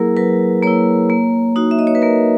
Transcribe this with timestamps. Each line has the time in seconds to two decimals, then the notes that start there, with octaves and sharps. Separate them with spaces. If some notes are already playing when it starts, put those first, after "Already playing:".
Already playing: F#3 A#3 E4 G#4 A#4
0.17 F#3 B4
0.63 A#3 E4 C#5
1.10 A#3
1.56 D#4 F#4
1.71 E5
1.79 D#5
1.87 C#5
1.95 B4
2.02 A#3 A#4